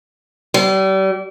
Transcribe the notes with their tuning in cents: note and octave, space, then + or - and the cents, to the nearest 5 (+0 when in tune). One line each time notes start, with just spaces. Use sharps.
G3 -35